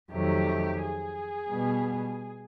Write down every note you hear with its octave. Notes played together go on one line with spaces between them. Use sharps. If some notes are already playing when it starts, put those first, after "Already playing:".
F2 C3 D#3 F#3 A3 G4
G#4
B2 G3 B3